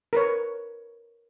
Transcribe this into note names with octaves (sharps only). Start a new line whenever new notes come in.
A#4 B4 C#5